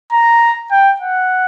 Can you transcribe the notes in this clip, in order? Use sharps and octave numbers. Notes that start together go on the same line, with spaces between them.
A#5
G5
F#5